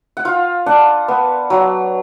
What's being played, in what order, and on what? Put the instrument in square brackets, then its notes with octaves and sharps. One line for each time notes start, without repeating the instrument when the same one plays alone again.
[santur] F#5
F4 F5
D4 F#5
B3
F#3